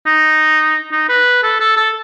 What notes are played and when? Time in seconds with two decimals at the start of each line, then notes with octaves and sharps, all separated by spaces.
0.06 D#4
0.92 D#4
1.09 B4
1.43 A4
1.60 A4
1.77 A4